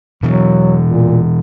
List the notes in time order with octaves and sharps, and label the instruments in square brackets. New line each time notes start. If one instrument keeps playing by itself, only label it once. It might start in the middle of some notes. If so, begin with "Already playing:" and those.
[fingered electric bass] B2 E3 [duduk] F#3
[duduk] A#2